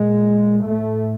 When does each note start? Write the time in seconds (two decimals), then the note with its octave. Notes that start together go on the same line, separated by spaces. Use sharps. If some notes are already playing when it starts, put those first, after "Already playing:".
Already playing: A#2 G#3
0.64 A2 A3